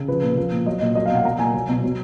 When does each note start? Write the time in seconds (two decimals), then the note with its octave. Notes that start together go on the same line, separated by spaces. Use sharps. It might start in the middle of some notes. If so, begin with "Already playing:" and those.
Already playing: C#3
0.08 F3 B4
0.23 A#2
0.37 F3
0.52 A#2
0.66 F#3 D#5
0.81 A#2 D#5
0.95 F#3 D#5
1.06 F5
1.10 B2
1.15 F#5
1.25 F#3 A#5
1.39 A#2 G#5
1.54 F#3
1.69 B2
1.83 F#3